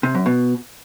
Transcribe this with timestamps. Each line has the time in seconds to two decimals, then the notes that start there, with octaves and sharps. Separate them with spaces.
0.03 C3
0.15 F#2
0.26 B2